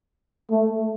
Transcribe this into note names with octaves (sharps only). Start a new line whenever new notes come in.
A3